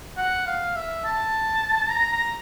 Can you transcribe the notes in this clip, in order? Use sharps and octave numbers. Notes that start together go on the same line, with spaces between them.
F#5
F5
E5
A5
A#5
A#5